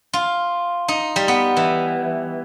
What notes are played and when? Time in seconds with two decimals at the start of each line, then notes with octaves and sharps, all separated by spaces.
0.13 F4
0.88 D#4
1.16 G3
1.28 B3
1.57 E3